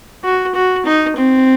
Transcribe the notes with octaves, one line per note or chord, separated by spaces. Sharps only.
F#4
F#4
D#4
C4